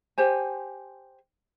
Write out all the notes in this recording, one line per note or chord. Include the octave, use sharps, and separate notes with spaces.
G4 C5 G#5